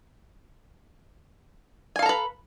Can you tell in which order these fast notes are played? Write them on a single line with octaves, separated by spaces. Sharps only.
G#5 F5 A4 A#5 B4